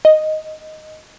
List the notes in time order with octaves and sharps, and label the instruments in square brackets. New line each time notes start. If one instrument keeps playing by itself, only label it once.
[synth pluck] D#5